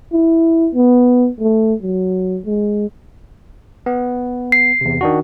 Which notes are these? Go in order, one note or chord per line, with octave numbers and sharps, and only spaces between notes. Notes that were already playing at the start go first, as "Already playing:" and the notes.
E4
B3
A3
F#3
G#3
B3
C7
E2 C3
D#3 D4 F#4